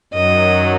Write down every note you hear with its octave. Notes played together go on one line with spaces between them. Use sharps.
F#2 D#3 F#3 D#5